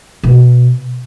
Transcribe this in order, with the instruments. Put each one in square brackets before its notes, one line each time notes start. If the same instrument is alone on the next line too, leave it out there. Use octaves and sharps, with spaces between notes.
[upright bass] B2